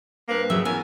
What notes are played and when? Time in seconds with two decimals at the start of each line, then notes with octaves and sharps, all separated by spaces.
0.28 G2 A#3 C4 B4
0.50 C#3 F#3 E5
0.65 E3 B3 A#4 G#5